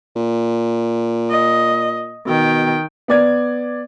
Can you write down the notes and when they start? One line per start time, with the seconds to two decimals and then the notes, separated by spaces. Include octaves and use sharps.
0.16 A#2
1.30 D#5
2.27 B2 D#3 G5
3.08 B3 D5 G#6